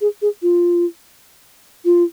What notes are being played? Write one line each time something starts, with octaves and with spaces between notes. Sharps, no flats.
G#4
G#4
F4
F4